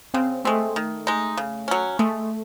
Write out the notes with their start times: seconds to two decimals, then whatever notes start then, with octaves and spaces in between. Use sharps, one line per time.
0.14 C#3 C4
0.45 G#3 A3 C4
0.76 D#3
1.07 G#3 D#4
1.37 C#3
1.68 F#3 C#4
1.99 G#3 A3